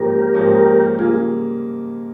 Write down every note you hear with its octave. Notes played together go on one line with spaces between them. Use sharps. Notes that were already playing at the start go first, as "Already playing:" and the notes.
Already playing: G#2 F3 A#3 C#4 G4 A#4
G#2 F3 A#3 C#4
C#3 G3 A#3 F4 G#4